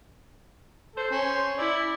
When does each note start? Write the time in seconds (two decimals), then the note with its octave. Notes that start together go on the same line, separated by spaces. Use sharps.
0.96 A4 C5
1.11 C#4
1.58 E4 D5